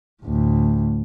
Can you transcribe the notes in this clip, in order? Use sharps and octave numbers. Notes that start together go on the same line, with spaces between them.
D2 A2